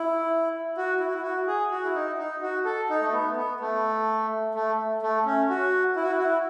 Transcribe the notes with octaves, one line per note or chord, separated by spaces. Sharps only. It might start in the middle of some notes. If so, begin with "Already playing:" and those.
Already playing: E4
F#4
E4
F#4
E4
F#4
G#4
F#4
E4
D#4
D#4
F#4
A4
D#4
A3
B3
B3
A3
A3
A3
C#4
F#4
E4
F#4
E4
F#4
E4